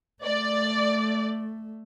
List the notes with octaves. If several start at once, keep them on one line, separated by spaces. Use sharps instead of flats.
A3 D5